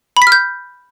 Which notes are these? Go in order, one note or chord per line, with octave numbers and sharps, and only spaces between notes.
B5
B6
F6
G6